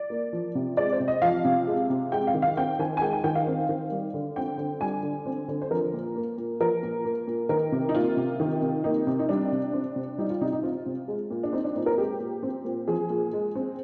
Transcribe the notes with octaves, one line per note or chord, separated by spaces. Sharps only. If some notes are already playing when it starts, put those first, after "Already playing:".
Already playing: D5
A#3
F3
C3
G#3 D5
C5
C3
D#5
F3 F5
C3
G#3
C3
G#3 G5
F5
D#3
F5
C4 G5
D#3 G#5
G#5
G#3 G5
G#5
D#3 G5
F5
C4
D#3
G3
D3
C4 G5
D3
G3 G#5
D3
C4
D3
C5
F3 A#4
A#2
A#3
A#2
F3 A#4
A#2
A#3
A#2
D#3 A#4
C3
D#4
A#3 F4
C3
D#3
C3
A#3 D#4
C3
D#4
G3 D4
C3
C4
C3
G3 D#4
F4
C3 D#4
D#4
C4 F4
C3
G#3
A#2
D4
C4 D#4
D4
A#2 D#4
A#4
G#3 G4
A#2
C4
A#2
F3 G#4
A#2
G#3
C4